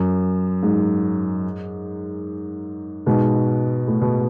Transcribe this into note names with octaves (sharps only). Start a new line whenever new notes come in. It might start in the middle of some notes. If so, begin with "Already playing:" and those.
Already playing: F#2
G#2
G#2 B2
A2
B2